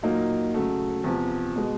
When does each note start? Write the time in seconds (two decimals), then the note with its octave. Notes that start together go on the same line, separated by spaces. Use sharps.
0.03 A#2 F#3 A#3 D#4
0.54 C#3 F#3 A3
1.04 E2 C3 F3
1.56 B2 G#3